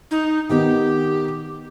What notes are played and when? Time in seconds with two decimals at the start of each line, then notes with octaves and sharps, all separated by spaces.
0.11 D#4
0.50 D#3 B3 G4